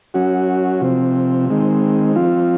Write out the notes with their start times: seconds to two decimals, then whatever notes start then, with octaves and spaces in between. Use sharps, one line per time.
0.14 F#3 C#4 F#4
0.81 C3 F3 C4
1.49 D#3 G#3 C4
2.16 F3 C4 F4